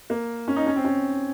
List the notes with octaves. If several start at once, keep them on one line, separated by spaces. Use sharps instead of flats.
A#3
C#4
D#4
C#4
C4
C#4